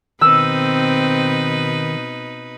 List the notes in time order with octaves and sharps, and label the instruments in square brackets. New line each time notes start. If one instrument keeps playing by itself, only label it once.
[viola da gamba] B2 D#4 B4 [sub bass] D#3 [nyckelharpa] C4 [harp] E6